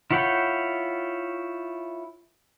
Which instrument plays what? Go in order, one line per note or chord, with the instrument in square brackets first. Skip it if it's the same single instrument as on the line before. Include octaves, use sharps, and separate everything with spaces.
[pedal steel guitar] E4 F4 C#5 F#5 G5